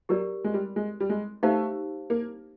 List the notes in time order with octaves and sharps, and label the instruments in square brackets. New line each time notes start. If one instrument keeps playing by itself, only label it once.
[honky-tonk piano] F#3 [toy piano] G4 A#4 D5
[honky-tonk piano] G#3
G3
G#3
G3
G#3
[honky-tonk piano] A3 [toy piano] D#4 G4 C5 F5 A5
[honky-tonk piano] A#3